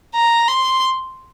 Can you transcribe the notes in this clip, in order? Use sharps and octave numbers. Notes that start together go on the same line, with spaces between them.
A#5
C6